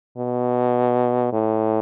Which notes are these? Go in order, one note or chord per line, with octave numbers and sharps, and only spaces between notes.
B2
A2